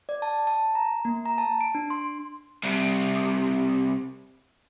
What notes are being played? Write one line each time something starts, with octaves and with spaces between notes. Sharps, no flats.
D5
A5
A5
A#5
A#3
A#5
A5
D7
D4
C6
C2 C3